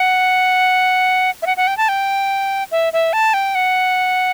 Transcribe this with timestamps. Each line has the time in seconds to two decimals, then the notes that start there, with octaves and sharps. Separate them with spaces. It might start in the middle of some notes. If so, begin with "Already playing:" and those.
Already playing: F#5
1.42 E5
1.46 F#5
1.57 F#5
1.67 G5
1.77 A5
1.88 G5
2.71 E5
2.93 E5
3.13 A5
3.34 G5
3.55 F#5